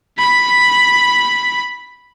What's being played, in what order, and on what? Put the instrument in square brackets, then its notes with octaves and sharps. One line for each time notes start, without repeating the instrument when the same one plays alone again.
[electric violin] B5 B6